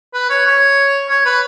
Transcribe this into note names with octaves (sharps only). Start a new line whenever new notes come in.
B4
C#5
C#5
C#5
B4